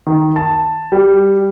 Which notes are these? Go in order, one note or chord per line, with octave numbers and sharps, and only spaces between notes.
D#3
A5
G3